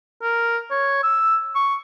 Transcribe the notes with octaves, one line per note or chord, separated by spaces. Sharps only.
A#4
C#5
E6
C#6